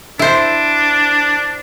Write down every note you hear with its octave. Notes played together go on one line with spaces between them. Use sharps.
D4 E4 C5